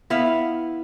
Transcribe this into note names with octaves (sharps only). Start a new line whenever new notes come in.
B3 E4 E5 F5